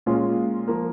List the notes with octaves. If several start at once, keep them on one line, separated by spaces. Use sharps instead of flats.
A#2 G#3 C#4 F4
F3 A#3